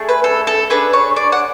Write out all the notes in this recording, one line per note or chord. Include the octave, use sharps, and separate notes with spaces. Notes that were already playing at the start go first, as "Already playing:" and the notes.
Already playing: A3 D4 G#4
B4
A4
A4
D4 G#4 B4
C#5
D5
F#5